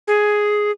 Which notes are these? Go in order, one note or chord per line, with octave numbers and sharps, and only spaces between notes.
G#4